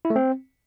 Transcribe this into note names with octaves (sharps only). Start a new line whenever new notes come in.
E4
A3
C4